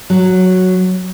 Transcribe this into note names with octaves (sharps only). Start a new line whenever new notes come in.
F#3